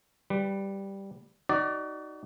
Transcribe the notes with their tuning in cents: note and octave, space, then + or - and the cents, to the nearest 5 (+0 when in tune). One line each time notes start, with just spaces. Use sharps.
G3 +0 B4 +20
D#4 +0 F#4 +35 D5 +5